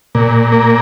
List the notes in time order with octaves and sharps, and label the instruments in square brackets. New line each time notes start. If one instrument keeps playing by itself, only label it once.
[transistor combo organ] A#2
A#3